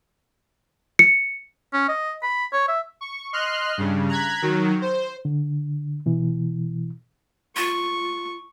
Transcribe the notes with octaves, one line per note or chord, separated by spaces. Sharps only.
C#7
C#4
D#5
B5
C#5
E5
C#6
D#5 C6 F6 F#6
G2 C#3
A#5 F#6 G#6 B6
D#3 F#3
C5
D3
B2 E3
F4 C#6